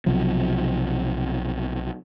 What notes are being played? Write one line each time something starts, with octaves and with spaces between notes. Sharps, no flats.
B1 C3 F3 F#3